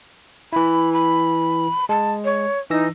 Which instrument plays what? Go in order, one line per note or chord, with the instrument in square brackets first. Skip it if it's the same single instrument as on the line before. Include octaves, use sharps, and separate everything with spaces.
[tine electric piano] E3 E4 [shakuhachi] B5
[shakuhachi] B5
[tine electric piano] G#3 [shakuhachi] A5
[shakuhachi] C#5
[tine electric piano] E3 E6 A#6 [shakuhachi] D#4